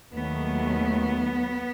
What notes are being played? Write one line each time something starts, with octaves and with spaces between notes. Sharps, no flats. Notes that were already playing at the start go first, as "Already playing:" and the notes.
D#2 D#3 F#3 A3 B3